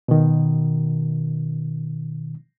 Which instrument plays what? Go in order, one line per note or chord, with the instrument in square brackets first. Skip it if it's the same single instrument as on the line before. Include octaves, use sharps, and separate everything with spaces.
[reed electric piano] B2 D#3